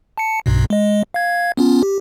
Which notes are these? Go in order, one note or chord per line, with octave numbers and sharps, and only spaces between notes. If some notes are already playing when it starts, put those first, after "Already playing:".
A5 C#7
B1 G2 B2
G#3 D#5
F5 G#6
B3 C#4 F4
G4